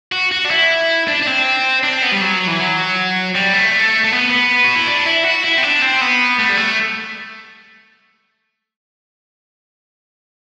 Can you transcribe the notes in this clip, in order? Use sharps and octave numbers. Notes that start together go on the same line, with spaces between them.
F#4
F#4
D4
E4
D4
D4
C4
D4
C4
B3
G3
F#3
E3
F#3
G3
A3
A3
B3
B3
F#4
E4
D4
E4
F#4
E4
C4
D4
C4
B3
A3
G3
A3